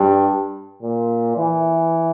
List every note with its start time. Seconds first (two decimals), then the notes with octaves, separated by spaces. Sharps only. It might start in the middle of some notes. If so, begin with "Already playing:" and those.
Already playing: G2
0.82 A#2
1.37 E3